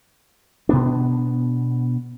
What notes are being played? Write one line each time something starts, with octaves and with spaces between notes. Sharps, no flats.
B2 B3 D4